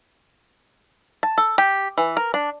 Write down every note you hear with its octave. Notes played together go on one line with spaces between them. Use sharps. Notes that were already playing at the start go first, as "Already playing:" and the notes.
A5
A4
G4
E3
A#4
D4